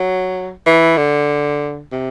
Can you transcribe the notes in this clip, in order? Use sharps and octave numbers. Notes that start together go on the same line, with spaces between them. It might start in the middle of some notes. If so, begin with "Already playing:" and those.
Already playing: F#3
E3
D3
C3